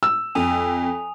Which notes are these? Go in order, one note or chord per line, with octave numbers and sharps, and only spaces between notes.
E6
F2 G#5 D#6 F7